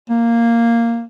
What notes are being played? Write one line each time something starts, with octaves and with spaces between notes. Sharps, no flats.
A#3